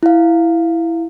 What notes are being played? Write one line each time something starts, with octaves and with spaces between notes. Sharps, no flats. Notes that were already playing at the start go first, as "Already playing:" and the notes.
E4 F5